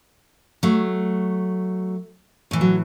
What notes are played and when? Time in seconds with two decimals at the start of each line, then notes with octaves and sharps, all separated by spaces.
0.63 F#3 A3
2.51 A2 E3
2.61 F#3